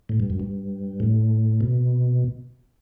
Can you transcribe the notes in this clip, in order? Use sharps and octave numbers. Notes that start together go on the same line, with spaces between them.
A2
G2
F#2
G2
A2
B2